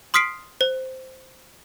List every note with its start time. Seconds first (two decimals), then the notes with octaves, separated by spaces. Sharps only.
0.14 C6 D#6 F6 B6 C7 D7
0.61 C5